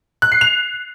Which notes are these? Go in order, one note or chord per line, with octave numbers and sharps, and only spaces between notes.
F#6
C7
F7